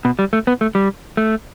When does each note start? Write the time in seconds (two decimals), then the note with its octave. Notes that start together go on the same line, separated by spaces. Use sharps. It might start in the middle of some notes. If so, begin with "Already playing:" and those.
0.05 B2
0.19 G3
0.33 A3
0.47 B3
0.61 A3
0.75 G3
1.17 A3